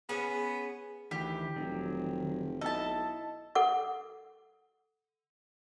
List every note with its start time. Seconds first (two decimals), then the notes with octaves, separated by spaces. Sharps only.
0.09 B3 C#4 G#4
1.11 D2 D#3 E3 G4
1.56 F1 D#3 F#3
2.61 B1 E4 A4 D#5 A5
3.55 A4 F#5 D6